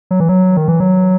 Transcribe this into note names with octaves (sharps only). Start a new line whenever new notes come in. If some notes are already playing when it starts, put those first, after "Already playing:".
F#3
E3
F#3
D#3
E3
F#3